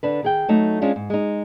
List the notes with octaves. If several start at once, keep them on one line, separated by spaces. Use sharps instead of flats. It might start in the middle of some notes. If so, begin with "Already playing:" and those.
D3 D4 B4
D#3 G#4 G5
F#3 A3 D#4
G#3 C#4 D4 F4
G#2
G#3 D#4